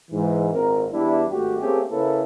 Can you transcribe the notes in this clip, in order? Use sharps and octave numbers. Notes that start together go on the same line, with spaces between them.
G#2 E3
G#1 A#2 C4 A#4
E2 G3 B3 D4 E4
G#1 G2 A3 F#4 G4
A3 A#3 C4 C#4 G4 G#4
C#3 A#3 C#4 E4 A4 B4